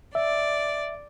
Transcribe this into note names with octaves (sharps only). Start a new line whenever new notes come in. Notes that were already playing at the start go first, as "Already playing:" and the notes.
D5 E5